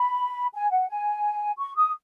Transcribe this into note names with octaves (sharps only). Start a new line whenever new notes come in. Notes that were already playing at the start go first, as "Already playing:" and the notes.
Already playing: B5
G#5
F#5
G#5
C#6
D#6